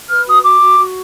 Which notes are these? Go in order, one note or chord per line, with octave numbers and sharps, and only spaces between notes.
B4 F6
F#4 D#6
F#4 D6
F#4
F#4